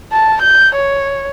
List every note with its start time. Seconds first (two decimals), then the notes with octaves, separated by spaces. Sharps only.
0.12 A5
0.42 G6
0.75 C#5